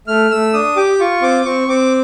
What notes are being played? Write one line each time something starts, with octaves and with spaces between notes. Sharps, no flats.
A3 F6
A3 E6
D4 D#6
G4 D6
F4 C#6
C4 D6
C4 C#6
C4 D6